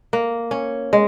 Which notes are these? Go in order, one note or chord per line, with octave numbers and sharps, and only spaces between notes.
A#3
C#4
G#3